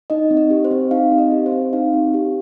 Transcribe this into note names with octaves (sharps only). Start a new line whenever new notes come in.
D#4 D#5
C4
D#5
G4
C5
C4
D#4 F5
C4
D#5
G4
C5
C4
D#4 F5
C4
G4